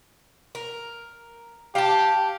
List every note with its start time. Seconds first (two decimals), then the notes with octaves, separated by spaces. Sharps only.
0.55 A#4
1.75 G4 F5 A5